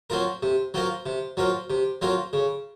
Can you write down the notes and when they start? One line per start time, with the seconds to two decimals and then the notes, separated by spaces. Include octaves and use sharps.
0.10 F#3 C4 F4 A#4
0.42 C3
0.74 F#3 C4 F4 A#4
1.06 C3
1.37 F#3 C4 F4 A#4
1.70 C3
2.02 F#3 C4 F4 A#4
2.33 C#3